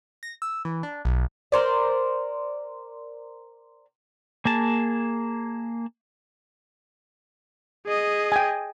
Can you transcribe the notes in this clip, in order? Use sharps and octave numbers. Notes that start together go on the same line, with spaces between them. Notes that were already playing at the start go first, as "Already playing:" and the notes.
A#6
E6
E3
D4
B1
A#4 C5 D5
A#3 G#4 A5
G#4 D#5
G5 G#5